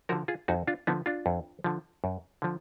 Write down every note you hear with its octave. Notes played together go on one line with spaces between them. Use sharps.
D3 F3 F#4 A#4
F4 G#4
F2 D#4 F#4
D4 F4
D3 F3 B3 D#4
D4 F4
F2
D3 F3
F#2
D3 F3